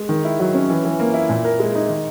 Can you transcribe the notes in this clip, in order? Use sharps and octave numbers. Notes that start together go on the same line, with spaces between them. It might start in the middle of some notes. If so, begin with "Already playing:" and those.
Already playing: G#3
D#3
E4
F#3
C#4
E3
E3
A#3
E4
A#2
A#4
G#3
D#4
D#3